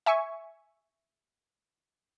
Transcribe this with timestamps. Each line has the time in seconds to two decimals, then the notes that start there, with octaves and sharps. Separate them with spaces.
0.06 E5 G#5 C#6